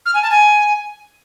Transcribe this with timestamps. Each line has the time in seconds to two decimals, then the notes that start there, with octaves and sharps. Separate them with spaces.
0.06 F6
0.14 G#5
0.22 A5
0.31 G#5